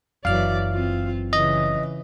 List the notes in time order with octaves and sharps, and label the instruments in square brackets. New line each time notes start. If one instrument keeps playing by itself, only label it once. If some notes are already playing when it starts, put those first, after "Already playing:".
[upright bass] F#1 F#2 [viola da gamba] E3 F#3 D5 [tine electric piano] F5 F6
[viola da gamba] C4 F4
[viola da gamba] C#3 E3 [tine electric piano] D#5